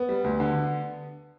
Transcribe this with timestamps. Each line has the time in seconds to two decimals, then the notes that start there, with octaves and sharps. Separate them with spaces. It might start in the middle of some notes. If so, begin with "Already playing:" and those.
Already playing: B3
0.09 G3
0.24 D2
0.40 D3